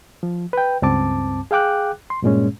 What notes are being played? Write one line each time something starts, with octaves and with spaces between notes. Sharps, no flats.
F3
B4 G5
C#2 G2 C4 A5 D6
G#4 F5 G5 D6 F#6
C6
G2 A#2 G#3 C#4